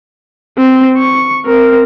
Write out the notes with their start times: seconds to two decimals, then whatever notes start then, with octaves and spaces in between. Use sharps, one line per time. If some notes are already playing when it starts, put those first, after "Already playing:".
0.58 C4
0.98 C#6
1.46 C4 A#4